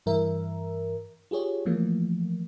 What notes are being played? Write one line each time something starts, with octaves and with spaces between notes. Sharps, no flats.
G2 E3 A#4 E5
F4 G4 G#4 C#5
E3 F3 A3 A#3